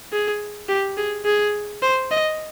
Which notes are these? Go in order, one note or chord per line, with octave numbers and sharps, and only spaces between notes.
G#4
G4
G#4
G#4
C5
D#5